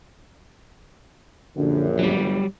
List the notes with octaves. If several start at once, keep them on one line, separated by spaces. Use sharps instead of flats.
A#1 F#2 D3
G1 F#3 G3